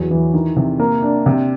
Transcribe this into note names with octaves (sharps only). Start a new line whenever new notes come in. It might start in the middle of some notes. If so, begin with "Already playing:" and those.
Already playing: E2 F#3
E3
D#3
C3
A#3
D4
C3